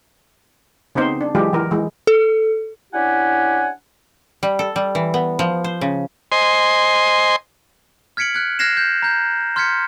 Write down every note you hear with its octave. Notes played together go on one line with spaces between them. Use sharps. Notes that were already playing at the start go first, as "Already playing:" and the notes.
C#3 B3 C4 D#4 C5
D4
E3 F#3 G#3 F4 G4
E3 A#4
E3 G#3
A4
C#4 D4 E4 G4 F#5 G#5
G3
A4
G3
E3
B3
F3
C5
C#3
C5 D#5 G#5 C6
F6 G#6 B6 C#7 D7 F#7
F6 F#6 G#6
F6 F#6 G#6 A#6 C7 E7
G6
A#5 G6
C6 F6 G6 G#6 B6 C#7